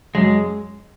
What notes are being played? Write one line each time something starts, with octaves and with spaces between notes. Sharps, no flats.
F#2 G#3